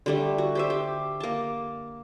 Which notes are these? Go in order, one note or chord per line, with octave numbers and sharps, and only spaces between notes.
D3 G3 A3
F#4
G4 C5 E5
G4
A#3 A5